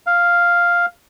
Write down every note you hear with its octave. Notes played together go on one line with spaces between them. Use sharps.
F5